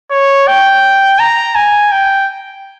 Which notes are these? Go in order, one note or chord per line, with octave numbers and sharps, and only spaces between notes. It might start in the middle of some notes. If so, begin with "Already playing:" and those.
C#5
G5
A#5
G#5
G5